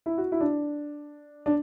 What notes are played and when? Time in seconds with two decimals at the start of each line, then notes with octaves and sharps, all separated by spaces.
0.06 E4
0.18 F#4
0.32 E4
0.41 D4
1.46 D4